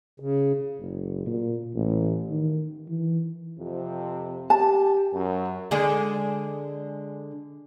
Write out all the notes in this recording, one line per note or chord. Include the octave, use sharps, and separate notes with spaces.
C#3
F#1
A#2
A1
D#3
E3
F2 C3
G4 A5
F#2
D3 G#3 G#4